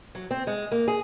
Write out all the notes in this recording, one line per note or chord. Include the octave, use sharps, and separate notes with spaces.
F#3
C4
G#3
A#3
G#4